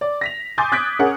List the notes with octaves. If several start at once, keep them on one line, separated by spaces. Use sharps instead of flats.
D5
A#6 B6 F7
G#5 C6 D6 D#6 G6 A6
D#6 F#6 G#6 A6 B6 D7
C#4 G#4 A#4 C#5 F#5